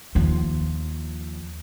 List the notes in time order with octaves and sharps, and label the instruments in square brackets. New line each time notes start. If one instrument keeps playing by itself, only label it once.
[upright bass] D#2 F3